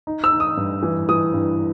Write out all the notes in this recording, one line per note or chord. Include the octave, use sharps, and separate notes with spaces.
D#4
E6
D#4
D#6
G2
E3
E3 D#6
G2